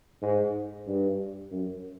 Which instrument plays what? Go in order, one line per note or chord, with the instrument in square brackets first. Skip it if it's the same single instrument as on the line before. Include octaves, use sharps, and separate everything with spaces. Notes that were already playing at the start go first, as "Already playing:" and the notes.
[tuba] G#2
G2
F#2